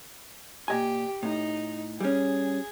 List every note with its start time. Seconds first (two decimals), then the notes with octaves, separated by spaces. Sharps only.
0.68 A#2 G4 D#5 G#5
1.23 A2 D#4
2.01 G3 C#4 G#4